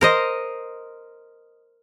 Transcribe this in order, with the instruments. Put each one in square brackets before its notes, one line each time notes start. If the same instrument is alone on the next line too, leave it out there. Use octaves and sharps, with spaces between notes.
[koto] A#4 C5 D#5